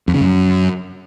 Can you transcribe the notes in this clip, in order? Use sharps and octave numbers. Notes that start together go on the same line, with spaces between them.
F2
C#3
F#2